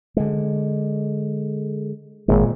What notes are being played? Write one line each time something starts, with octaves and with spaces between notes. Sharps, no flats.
D3 G#3
G#1 A#2 G#3